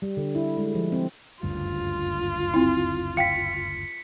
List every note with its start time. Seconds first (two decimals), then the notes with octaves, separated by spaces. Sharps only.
0.02 G3
0.17 D3
0.35 E4
0.57 G#3
0.75 F3
0.92 C4
1.43 F#1 D2 G2 F4
2.54 C4 E4
3.17 F5 G5 B6 C#7